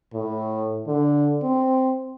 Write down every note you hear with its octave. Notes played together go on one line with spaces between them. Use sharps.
A2
D3
C4